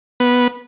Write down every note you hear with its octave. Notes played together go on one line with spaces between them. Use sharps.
B3